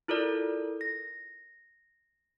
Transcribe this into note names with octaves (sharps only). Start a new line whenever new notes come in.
E4 F4 A4 A#4 D5
A#6